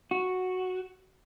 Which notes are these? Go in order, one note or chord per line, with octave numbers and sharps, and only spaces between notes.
F#4